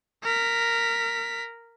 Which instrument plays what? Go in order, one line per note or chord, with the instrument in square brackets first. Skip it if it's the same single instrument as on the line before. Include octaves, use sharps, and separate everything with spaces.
[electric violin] A#4 B6